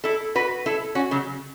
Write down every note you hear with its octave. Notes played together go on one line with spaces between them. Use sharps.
E4 A4
F#4 B4
E4 A4
C#4 F#4
C#3 F#3